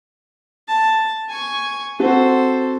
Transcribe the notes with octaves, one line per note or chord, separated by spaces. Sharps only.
A5
G#5 C#6
C4 F#4 A4 C5